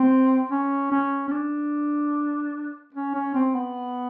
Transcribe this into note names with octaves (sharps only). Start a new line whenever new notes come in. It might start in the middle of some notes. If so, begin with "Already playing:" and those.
Already playing: C4
C#4
C#4
C#4
D4
C#4
C#4
C4
B3